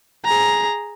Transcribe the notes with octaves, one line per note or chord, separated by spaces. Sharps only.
G#4 A#5